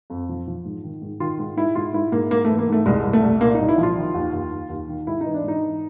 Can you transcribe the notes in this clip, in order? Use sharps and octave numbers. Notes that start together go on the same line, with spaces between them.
F2
F3
F3
G#2
D#3
G#2
D#3 F4
G#2
G#2 E4
G#2 F4
G#2 E4
G#2 A#3
G#2 A#3
E3 A3
A#3
G#2
A3
C2 G#3
C2
A3
C2
A#2 A#3
C2 D#4
E4
F3
F4
D#3
D#2
D#2
D#2
D#2
D#3
G#2 E4
D#4
E3
D4
G#2 D#4
E3